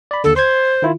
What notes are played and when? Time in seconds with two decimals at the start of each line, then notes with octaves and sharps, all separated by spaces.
0.11 D5 B5
0.24 D#2 D3 A4
0.36 C5 C6 G#6
0.82 D#3 E4 F4